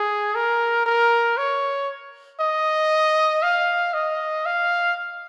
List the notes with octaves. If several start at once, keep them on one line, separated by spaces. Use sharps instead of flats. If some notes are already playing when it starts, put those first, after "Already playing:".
Already playing: G#4
A#4
A#4
C#5
D#5
F5
D#5
F5